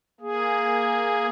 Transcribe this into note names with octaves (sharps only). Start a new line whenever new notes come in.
A#3 G#4